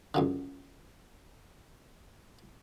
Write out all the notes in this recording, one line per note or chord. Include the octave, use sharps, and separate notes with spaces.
C#2 F#2 D3